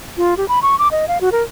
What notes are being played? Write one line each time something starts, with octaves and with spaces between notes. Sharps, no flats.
F4
G4
B5
C#6
D6
D#5
F5
F#4
A#4